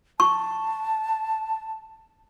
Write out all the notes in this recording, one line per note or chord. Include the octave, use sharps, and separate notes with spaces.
A5 C#6